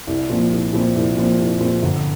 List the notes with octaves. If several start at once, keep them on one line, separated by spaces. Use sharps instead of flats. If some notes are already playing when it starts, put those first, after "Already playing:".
C2
A#2 F3 C4
C2
A#2 F3 C4
C2
A#2 F3 C4
C2
A#2 F3 C4
G1